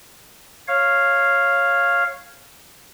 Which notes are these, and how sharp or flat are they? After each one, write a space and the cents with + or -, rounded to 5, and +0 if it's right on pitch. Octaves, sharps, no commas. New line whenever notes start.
C#5 -10 F5 -5